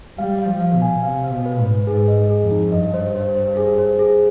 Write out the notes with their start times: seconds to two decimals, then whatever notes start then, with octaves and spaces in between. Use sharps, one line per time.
0.18 G3 F5
0.39 F5
0.46 F3
0.60 F5
0.74 B2
0.82 G#5
1.03 C3 F5
1.24 F5
1.30 B2
1.46 B4
1.59 G#2
1.66 B4
1.87 G#2 G#4
2.08 D#5
2.30 G#4
2.44 F2
2.51 D#4
2.72 G2 D#5
2.94 C5
3.15 C5
3.36 C5
3.57 G#4
3.78 C5
3.99 G#4